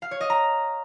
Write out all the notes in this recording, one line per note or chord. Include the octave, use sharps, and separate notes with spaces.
F5
C#5
D#5
A#5